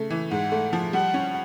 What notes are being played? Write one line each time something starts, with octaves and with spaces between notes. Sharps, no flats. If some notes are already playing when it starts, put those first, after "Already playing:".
Already playing: C#3 A3
E3
G#2 F#5
A3
F3
G3 F#5
C#4